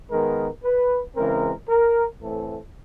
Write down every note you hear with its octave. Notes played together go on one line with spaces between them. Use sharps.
D#3 G#3 B3 A#4
B4
C#3 E3 G#3 C4 A#4
A#4
A2 E3 A3 C4 A4